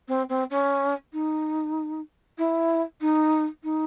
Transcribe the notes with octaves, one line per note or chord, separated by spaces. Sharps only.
C4
C4
C#4
D#4
E4
D#4
D#4